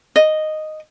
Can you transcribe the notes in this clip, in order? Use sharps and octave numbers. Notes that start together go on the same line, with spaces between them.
D#5